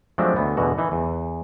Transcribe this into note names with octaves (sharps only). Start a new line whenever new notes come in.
F3 F#3 G#3 A3 C4 D4
D2 A3 B3
E2 B2 D3 F#4
E3 D#4
E2